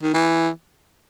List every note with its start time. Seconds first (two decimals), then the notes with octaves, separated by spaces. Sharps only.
0.02 D#3
0.14 E3